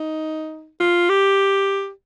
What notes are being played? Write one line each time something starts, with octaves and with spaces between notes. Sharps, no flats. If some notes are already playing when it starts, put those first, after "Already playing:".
Already playing: D#4
F4
G4